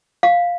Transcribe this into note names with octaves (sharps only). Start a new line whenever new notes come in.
F5